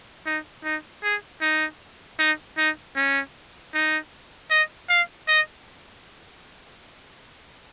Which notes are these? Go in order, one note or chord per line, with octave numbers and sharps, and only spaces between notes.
D#4
D#4
G#4
D#4
D#4
D#4
C#4
D#4
D#5
F5
D#5